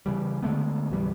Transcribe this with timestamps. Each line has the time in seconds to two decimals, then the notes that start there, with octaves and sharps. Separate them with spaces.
0.06 C#3 E3 G3
0.42 D3 G#3 A3 B3
0.90 B1 F#2 E3 G3